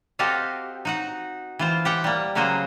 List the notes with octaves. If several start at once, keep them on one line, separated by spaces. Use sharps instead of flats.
C4 F#4 G4 A4 D#5 F5
D#4 F#4 F#5
E3 F4 C5
G4 F#5 G5
G3 A#3
C#3 F#3 A#3 F#4 G#4 C5